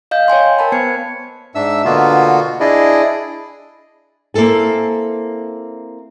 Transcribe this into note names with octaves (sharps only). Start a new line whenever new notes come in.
D#5 F5 G6
C#5 G5 G#5 C6
A#4 A5 B5
B3 C5 G#6 C#7
G#2 D4 E5 E6
B2 D3 A#3 B3 F4 F#4
D4 E4 G#4 D5 D#5
A#3 C4 E4 A4 G#5